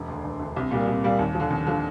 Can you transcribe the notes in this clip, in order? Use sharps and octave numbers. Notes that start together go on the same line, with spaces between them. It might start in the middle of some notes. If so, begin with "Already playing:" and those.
Already playing: E1
D2 D3
E1
D2 D3
C2
A#2 G3 A#3
C2
A#2 G3 A#3
D#2
D3 F3
D#2
D3 F3